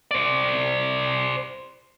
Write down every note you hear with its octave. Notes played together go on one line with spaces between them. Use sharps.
C5 D5